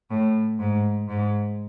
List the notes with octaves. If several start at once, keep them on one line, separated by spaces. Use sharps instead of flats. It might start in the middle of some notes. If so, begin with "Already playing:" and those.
A2
G#2
G#2